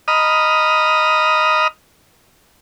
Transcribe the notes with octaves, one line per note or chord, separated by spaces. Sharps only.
D#5 A#5 B5 D#6 F6